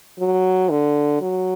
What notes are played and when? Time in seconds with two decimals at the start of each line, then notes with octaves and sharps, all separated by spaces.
0.19 F#3
0.70 D3
1.21 F#3